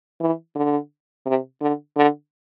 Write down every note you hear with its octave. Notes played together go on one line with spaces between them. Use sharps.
E3
D3
C3
D3
D3